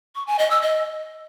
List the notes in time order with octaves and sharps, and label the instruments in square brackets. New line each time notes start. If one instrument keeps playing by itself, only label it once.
[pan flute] C#6
G#5
D#5
E6
D#5